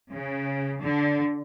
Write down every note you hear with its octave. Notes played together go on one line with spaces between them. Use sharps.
C#3
D3